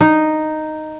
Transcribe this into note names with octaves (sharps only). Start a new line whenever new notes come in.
D#4